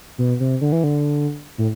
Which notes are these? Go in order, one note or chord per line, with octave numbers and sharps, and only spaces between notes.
B2
C3
D3
E3
D3
A2